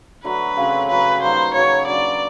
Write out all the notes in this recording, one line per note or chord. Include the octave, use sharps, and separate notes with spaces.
D3 F#3 A3 D4 B4
C#3 F#3 A3 C4
C#3 F#3 B3 B4
G3 A#3 D#4 C5
C#3 F#3 B3 C#5
F#3 A#3 D4 D5